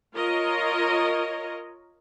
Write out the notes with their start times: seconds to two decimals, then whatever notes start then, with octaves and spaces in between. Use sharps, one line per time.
0.16 F4 A#4 C#5 D#5